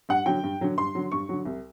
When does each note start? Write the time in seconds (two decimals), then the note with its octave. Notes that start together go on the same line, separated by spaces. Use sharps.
0.09 G2 F#5
0.26 D3 F#3 G5
0.43 G2
0.61 D3 F#3
0.78 G2 C6
0.95 D3 F#3
1.12 G2 C#6
1.29 D3 F#3
1.45 C2